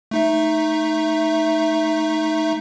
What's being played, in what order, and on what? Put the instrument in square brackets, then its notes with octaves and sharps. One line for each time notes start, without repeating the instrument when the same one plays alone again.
[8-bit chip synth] A3 D#4 E5